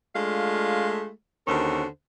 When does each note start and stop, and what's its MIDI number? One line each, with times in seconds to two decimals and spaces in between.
0.14 1.09 56
0.14 1.09 57
0.14 1.09 62
0.14 1.09 65
0.14 1.09 77
1.47 1.85 39
1.47 1.85 50
1.47 1.85 61
1.47 1.85 66
1.47 1.85 70
1.47 1.85 72